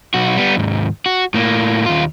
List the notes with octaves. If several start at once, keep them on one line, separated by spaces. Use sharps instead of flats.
B1 F#4
G3 B3
D#2 G#2
F#4
A2 A#3
D#2 F4